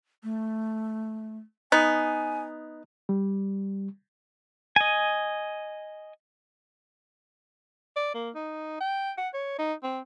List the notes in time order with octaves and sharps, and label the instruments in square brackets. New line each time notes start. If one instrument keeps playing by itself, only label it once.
[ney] A3
[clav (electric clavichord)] B3 [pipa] D#4 [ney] G#5
[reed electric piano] G3
[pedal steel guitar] D#5 G#5
[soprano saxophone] D5
A#3
D#4
G5
F#5
C#5
D#4
C4